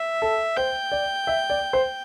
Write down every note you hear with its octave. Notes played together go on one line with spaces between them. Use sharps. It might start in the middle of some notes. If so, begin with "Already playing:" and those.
Already playing: E5
A4
C5 G5
D5
E5
D5
C5